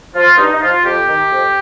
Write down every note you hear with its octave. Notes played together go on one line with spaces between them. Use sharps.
F3 F4
G2 D#4
D#4
F3 F4
F2 G4
D#3
F2